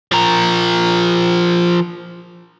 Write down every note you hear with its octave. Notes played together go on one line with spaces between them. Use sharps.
F3 A#4